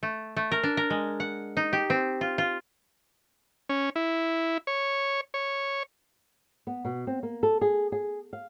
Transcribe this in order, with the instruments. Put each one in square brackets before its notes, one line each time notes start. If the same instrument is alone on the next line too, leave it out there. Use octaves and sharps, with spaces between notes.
[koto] A3
A3
A#4
D4
A#4
G#3
F#5
D#4
G4
C4
F4
F4
[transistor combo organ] C#4
E4
C#5
C#5
[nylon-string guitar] B3
B2
C4
A#3
A4
G#4
G#4
F5